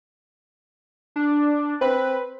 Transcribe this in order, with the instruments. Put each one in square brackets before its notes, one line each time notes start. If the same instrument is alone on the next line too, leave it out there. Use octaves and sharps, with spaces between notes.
[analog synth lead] D4
[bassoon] C4 [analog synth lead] B4